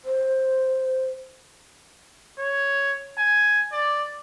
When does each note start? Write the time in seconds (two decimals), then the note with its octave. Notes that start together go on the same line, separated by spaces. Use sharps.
0.05 C5
2.39 C#5
3.18 G#5
3.72 D5